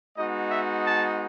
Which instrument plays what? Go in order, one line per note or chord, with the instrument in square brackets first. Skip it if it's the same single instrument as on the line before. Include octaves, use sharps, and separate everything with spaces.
[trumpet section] G#3 B3 D#4 F#4 D#5
E5
A5